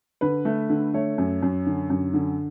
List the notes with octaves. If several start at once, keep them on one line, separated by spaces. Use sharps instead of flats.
D3 B4
A3
D3
A3 C#5
F#2
F#2
D3
F#2
D3